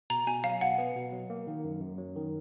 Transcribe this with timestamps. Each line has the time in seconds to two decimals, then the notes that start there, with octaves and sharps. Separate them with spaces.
0.10 B2 A#5
0.27 B2 G#5
0.44 F#3 F5
0.61 B2 F#5
0.78 B3
0.96 B2
1.12 F#3
1.30 A#3
1.47 D#3
1.64 F#2
1.81 F#2
1.98 F#3
2.16 D#3